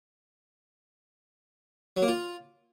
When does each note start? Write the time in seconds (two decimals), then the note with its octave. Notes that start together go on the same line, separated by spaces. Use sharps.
1.97 F#3
2.02 A#3
2.08 F4